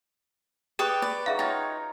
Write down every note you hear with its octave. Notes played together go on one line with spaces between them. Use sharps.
G4 G#4 B4 D5 C#6 D#6
B4 D5
F#3 D#4 G#4 E5 F5 G5
D#4 F4 C#5 G5 A#5 A6